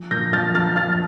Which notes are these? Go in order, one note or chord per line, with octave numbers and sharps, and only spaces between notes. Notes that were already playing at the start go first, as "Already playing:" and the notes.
Already playing: F3
A#2 G6 A#6
F3 F6 A6
F3 F6 A6
F3 F6 A6